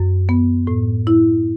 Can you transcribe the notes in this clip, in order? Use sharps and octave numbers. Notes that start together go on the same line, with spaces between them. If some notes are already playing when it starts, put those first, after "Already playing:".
Already playing: F#2
B3
A2
E4